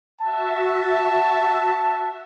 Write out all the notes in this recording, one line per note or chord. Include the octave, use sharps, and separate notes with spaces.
F#4 E5 A5